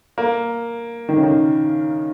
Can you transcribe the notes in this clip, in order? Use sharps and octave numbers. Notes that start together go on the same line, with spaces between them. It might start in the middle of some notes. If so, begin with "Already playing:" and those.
A#3
D#3
C#3
D#3